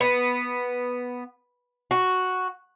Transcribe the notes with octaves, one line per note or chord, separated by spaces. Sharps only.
B3
F#4